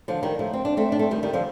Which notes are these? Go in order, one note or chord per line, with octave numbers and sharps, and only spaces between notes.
D3 F3
D#3 G3
F3 A3
C4
D4
A3 C4
D4
A3 C4
D#3 G3
D#3 G3
D3 F3